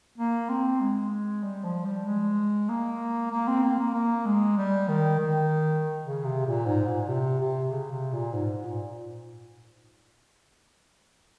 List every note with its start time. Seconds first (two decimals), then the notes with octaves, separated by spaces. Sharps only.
0.18 A#3
0.50 C4
0.81 G#3
1.44 G3
1.64 F3
1.85 G3
2.06 G#3
2.69 A#3
3.31 A#3
3.48 C4
3.63 A#3
3.79 A#3
3.94 A#3
4.26 G#3
4.58 G3
4.89 D#3
5.20 D#3
6.04 C#3
6.24 C3
6.45 A#2
6.66 G#2
6.88 A#2
7.08 C3
7.39 C3
7.71 C#3
7.92 C3
8.13 A#2
8.34 G#2
8.65 A#2